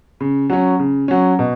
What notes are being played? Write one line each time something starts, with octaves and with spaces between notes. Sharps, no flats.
C#3
F#3 C#4
C#3
F#3 C#4
B2